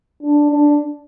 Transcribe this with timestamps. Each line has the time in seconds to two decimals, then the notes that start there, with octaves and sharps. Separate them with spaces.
0.23 D4
0.51 D4